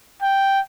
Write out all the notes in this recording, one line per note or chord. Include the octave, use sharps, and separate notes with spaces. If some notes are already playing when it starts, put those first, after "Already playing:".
G5